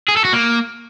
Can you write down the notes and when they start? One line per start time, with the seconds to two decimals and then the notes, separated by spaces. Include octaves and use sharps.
0.09 G#4
0.17 A4
0.25 F#4
0.33 A#3